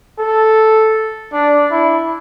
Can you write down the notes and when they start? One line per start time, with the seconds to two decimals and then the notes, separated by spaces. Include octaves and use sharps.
0.18 A4
1.33 D4
1.71 E4